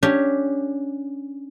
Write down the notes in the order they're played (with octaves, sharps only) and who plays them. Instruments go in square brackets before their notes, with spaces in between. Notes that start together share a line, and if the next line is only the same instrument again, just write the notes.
[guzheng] C#4 D4 G4